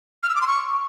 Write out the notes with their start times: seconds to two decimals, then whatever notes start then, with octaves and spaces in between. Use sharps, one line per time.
0.23 F6
0.29 E6
0.35 D6
0.41 C6
0.47 C#6